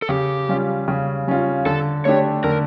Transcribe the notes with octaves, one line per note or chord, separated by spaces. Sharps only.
A4
C#3 G4
G3 C#4 F4
C#3
G3 C#4 F4
D3 A4
A3 D4 G4 C#5
D3 A#4